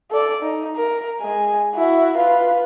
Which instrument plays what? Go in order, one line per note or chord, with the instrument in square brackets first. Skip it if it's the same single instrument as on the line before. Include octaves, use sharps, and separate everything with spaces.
[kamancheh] A4 D5
D#4
A#4
G#3 G#5
E4 F#4
F4 B4